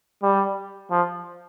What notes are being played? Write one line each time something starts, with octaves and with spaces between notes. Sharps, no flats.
G3
F3